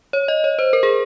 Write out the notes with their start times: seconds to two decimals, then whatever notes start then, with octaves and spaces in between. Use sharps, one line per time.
0.13 C#5
0.28 D#5
0.44 C#5
0.59 C5
0.73 A#4
0.83 G#4